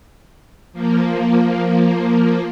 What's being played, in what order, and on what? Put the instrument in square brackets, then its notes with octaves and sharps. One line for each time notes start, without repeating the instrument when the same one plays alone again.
[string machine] F3 A#3